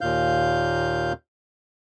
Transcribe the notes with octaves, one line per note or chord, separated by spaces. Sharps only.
D#2 A#2 F5 G6